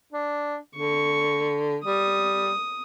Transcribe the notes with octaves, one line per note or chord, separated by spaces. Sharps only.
D4
D3 C#6
G3 D#6